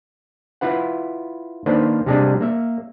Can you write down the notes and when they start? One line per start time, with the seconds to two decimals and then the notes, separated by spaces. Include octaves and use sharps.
0.61 E4 F4 B4 F#5
1.66 D#3 A#3 D4 B4 C5
2.06 C3 G3 G#3 D4 G#4
2.41 A#3 E5